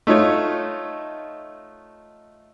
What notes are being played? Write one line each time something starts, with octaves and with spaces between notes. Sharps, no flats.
A3 D#4 F4 C#5